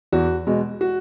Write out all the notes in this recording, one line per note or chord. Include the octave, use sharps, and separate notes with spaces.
E2 F#4
B2 G#3
F#4